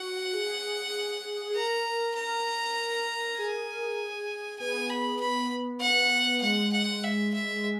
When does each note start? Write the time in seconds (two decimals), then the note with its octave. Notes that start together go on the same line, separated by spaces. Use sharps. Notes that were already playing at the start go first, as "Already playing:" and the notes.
Already playing: F#4 F#5
0.33 G#4
1.50 G#4
1.55 A#4 A#5
2.15 A#4 A#5
2.77 A#4
3.37 G#4 G#5
4.60 B3 G#5
4.90 B5
5.20 B5
5.81 F#5
6.42 G#3 F#5
6.73 F#5
7.03 E5
7.34 E5
7.64 G#3